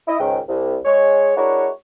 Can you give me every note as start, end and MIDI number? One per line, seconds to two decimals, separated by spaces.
0.07 0.18 64
0.07 0.18 75
0.19 0.39 37
0.19 0.39 44
0.19 0.39 51
0.19 0.39 79
0.48 0.76 36
0.85 1.35 56
0.85 1.35 73
1.36 1.67 56
1.36 1.67 62
1.36 1.67 64
1.36 1.67 66
1.36 1.67 70
1.36 1.67 73